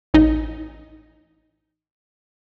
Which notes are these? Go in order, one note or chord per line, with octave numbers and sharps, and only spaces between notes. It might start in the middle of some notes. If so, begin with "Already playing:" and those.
A1 D#4 D#5